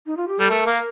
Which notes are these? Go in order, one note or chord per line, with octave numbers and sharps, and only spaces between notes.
D#4
F4
G4
G3 A4
A3 A#4
A#3